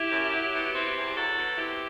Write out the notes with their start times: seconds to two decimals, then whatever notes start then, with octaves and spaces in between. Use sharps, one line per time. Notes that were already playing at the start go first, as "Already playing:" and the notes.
Already playing: E4 G4
0.12 F#2
0.33 F#3
0.54 B2
0.75 C4
0.96 E2
1.16 F#3 F#4 A4
1.37 B2
1.58 C4 E4 G4